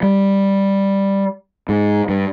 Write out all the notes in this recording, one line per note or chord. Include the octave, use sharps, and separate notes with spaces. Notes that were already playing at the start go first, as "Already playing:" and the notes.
G3
G#2
G2